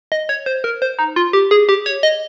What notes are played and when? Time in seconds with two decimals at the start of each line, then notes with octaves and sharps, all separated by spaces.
0.12 D#5
0.29 C#5
0.46 C5
0.64 A#4
0.82 C5
0.99 D#4
1.16 F4
1.33 G4
1.51 G#4
1.69 G4
1.86 C#5
2.03 D#5